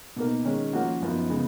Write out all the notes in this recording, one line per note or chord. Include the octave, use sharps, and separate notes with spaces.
B2 A#3 D#4 A#4
D#3 G#3 C#4
F3 A#3 C#4 F#4
F#2 F3 B3 D#4
C#3 G#3 B3